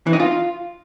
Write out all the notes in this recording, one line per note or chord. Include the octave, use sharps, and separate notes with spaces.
E3
D#4
F4